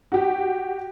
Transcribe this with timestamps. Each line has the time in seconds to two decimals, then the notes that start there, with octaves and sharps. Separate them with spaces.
0.12 F#4 G4